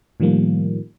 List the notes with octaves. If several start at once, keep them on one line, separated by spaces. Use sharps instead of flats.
A2 D#3 F3 G3 A#3